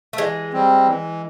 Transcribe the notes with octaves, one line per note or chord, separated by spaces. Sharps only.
A3
E3 G#3
G3 C4
E3